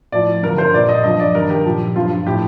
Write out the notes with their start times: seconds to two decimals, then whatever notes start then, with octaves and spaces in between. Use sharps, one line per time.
0.12 A2 F3 D5
0.43 G2 D3 F3 A#4
0.58 C5
0.74 A#2 G3 D5
0.89 D#5
1.04 G2 F3 D#5
1.20 D5
1.35 G2 D#3 G3 A#4
1.50 G4
1.65 A#2 F3
1.96 G2 F3 F4
2.26 A2 F3 G4